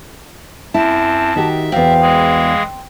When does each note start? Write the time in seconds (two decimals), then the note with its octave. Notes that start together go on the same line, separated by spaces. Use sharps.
0.74 F#2 C4 E4 A5
1.36 D#3 F#4 G4 E5
1.72 E2 C4 F#4 F5
2.01 E3 G#3 G#4